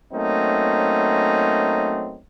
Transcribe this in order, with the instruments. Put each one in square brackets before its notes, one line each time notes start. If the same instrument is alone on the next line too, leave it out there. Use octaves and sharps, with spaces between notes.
[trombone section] F#3 A3 A#3 C4 C#4 D#4